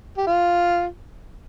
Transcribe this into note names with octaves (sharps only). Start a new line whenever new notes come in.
G4
F4